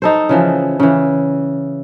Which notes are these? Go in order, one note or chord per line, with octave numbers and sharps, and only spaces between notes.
D#4 A4 C5
C#3 E3 F3
C#3 E3